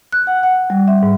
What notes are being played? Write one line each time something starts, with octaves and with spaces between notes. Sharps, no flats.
F#6
F#5
F#5
G3
E5
G#2